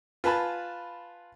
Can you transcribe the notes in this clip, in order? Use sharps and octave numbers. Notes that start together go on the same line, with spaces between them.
F4 B4 G#5 A5 B5